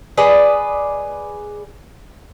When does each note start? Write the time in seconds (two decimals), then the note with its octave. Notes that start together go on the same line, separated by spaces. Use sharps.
0.18 G#4 B4 D5 D#5